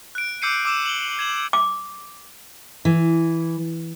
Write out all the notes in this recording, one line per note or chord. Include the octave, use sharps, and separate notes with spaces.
F#6 D7
D6 E6 G6 C7 C#7 D#7
D6 E6 E7
F#7 G7
G#6 E7 F#7
D6
E3